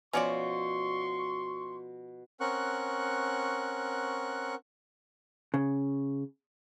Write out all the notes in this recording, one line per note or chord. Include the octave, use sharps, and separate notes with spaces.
B2 F3 C#4 F#4 C#5 D5 C6 C#6
C4 C#4 A#4 F#5 C#6 F#6
C#3